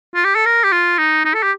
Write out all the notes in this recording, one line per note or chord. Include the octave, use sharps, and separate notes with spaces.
F4
G4
A4
A#4
G4
F4
D#4
D#4
A4
G4